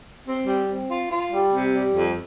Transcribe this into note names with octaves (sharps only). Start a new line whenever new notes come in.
C4
G3
C4
F4
F4
G3
C3
G3
F2